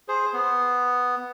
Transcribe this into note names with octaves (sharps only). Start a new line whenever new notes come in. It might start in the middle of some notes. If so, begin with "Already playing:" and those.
G#4 C5
B3